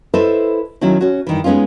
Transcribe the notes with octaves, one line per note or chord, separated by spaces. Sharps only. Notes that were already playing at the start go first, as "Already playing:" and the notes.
E4 A4 B4 C5 D#5 E5
D#3 F#3 C#4 E4
C#4 F#4
G2 D#3 E3
G#3 B3 C#4 D#4 F4